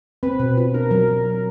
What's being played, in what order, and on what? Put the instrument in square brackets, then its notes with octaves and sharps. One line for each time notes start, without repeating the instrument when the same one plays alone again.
[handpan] C4 [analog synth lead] B4
[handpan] B2
F4
[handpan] D4 [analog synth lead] A#4
[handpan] F#3
F#3
C4